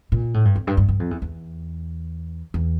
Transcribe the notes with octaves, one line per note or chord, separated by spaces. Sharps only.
A#2
A2
G2
F2
G2
G2
G2
F2
E2
E2
E2